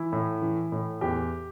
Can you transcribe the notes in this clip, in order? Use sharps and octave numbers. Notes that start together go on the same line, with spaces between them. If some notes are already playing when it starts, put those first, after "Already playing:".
Already playing: E3 E4
A2
E3
A2
E2 G4